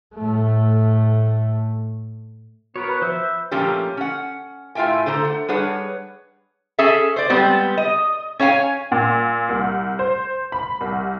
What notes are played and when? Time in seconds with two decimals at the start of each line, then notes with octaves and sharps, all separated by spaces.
0.14 A2 A3
2.76 B3 F#4 A#4 C#5
2.88 B4 B5 F#6
3.02 F3 C5 E5 G6
3.23 G6
3.51 A#2 F3 A3 A#3 C#4 G4
3.97 C#4 F#5
4.75 A2 F4 A#4 E5 G5 G#5
5.06 D3 A3 C5 A#5
5.24 F#5
5.48 G3 D4 G#4 B4 C#5 F#5
6.79 C#4 G#4 A4 E5
7.16 C5 D5
7.30 G3 G#3 B3 C4
7.78 D#5
8.39 C#4 C#5 F5 G5 G#5
8.92 A#2
9.49 C2
9.99 C5
10.52 B5
10.81 C2